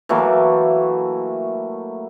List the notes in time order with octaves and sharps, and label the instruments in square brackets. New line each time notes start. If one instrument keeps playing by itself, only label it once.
[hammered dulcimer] E3 F#3 A3 A#3